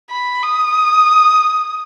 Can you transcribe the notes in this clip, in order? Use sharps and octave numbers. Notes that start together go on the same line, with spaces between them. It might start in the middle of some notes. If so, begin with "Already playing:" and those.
B5
D#6